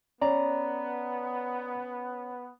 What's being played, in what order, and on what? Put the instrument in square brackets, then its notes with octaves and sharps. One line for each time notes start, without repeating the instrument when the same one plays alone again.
[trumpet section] B3 [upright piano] C#4 [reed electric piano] D5 A#5